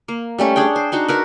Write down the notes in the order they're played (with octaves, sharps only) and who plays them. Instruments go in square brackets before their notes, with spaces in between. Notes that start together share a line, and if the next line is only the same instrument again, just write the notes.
[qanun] A#3
G3 A3 C#4 G4
D4 G#4 C#5 G5
C5
D4 D#4 F#4 C5
F#4 A#4 B4